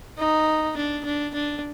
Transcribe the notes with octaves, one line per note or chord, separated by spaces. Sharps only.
D#4
D4
D4
D4